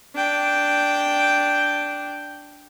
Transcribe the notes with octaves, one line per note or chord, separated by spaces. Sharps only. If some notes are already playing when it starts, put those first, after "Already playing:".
D4 G5